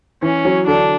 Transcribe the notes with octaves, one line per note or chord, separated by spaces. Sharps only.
E3 C#4
F#3
D3 D4